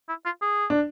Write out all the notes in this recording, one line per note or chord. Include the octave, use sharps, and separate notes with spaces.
E4
F4
G#4
D4